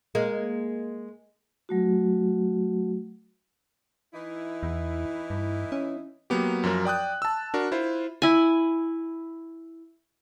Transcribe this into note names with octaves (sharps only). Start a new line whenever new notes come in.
G#3 A#3
F#3 A3 F#4
E3 D#4 E4
E2
G2
C#4
F#3 A#3 B3 G4
F#2 F3 F#3 A#4
D5 G5 D#6 F#6
A5 E6
D4 F#4 A#4
E4 F4 C5
E4 G#5